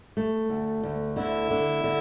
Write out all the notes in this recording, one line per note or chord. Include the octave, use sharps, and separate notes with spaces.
A3
D2
D2
D3 E4
D3
D3